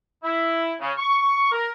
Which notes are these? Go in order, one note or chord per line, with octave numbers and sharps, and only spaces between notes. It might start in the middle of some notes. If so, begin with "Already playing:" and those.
E4
C#3
C#6
A#4